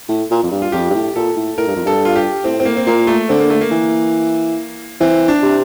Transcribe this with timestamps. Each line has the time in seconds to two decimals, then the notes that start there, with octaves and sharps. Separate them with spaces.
0.09 A2
0.31 A#2
0.43 F2
0.52 G2
0.62 F4
0.72 F2 G4
0.90 G2
0.95 A2
1.16 A#2 A4
1.37 A2
1.58 A2 A#4
1.67 G2
1.76 F2
1.85 G2 A4
2.05 F4
2.16 G4
2.44 A2 C4
2.60 C4
2.65 A#3
2.77 C4
2.87 A#2 A#3
3.07 A3
3.29 D3 C4
3.40 A#3
3.50 A3
3.61 A#3
3.71 E3
5.01 E3 C4
5.28 D4
5.43 C3